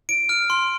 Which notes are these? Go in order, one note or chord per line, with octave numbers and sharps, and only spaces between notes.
D7
F6
C6